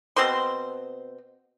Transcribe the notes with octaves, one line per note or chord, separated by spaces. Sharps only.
B2 C4 C5 C6